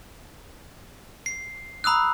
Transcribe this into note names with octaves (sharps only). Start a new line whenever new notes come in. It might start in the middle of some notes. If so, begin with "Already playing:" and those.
C7
A#5 B5 D#6 E6 F#6